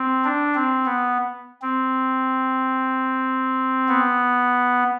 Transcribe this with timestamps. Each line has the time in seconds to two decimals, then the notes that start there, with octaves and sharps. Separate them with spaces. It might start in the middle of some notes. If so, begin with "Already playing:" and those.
Already playing: C4
0.25 D4
0.55 C4
0.86 B3
1.62 C4
3.88 B3